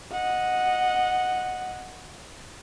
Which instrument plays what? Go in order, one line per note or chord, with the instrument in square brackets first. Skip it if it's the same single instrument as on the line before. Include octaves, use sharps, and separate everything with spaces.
[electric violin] D#5 F#5